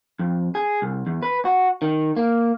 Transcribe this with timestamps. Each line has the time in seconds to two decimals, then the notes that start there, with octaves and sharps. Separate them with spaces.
0.19 F2
0.55 G#4
0.82 C2
1.07 E2
1.23 B4
1.45 F#4
1.82 D#3
2.17 A#3